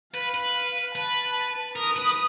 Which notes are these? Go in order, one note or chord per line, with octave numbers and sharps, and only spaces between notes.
B4 F5
B4
B4 A5
A#4 D#6
B4